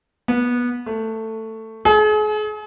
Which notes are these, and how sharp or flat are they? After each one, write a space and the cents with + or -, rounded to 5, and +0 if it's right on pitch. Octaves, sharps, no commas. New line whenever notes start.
B3 -20
A3 +15
G#4 +40